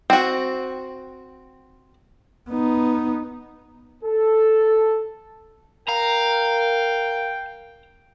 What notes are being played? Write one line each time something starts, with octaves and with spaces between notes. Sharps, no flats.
C4 F#4
B3 D#4
A4
A#4 F5 G5 A#5